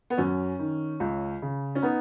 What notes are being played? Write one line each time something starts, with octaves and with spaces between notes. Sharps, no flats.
B3
F#2 C#4
D#3
C#2
C#3
C#4
B3 D#4